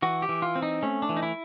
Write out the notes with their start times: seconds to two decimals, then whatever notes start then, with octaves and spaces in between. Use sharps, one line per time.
0.02 E3 F#4
0.22 G4
0.29 E3
0.42 F4
0.56 C4
0.62 D#4
0.83 A3 C#4
1.02 D4
1.09 E3
1.17 D#4
1.23 E4